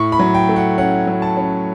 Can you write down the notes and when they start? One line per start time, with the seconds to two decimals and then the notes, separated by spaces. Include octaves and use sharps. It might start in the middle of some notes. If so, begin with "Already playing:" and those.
Already playing: A2 C#6
0.12 B5
0.19 F#3
0.34 G5
0.49 A3
0.56 F#5
0.78 C#4 F#5
1.07 F#3
1.22 A5
1.37 C#4